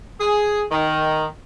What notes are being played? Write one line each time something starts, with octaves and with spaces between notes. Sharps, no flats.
G#4
D#3